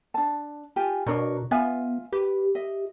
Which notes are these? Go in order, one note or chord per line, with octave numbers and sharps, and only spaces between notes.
D4 A5
F4 G4 G#5
B2 D4 A#4 C#5
B3 F4 E5 G#5
G4 B4
D#5 E5